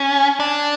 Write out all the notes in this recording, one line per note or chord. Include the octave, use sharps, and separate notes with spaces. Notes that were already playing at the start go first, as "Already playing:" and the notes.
Already playing: C#4
D4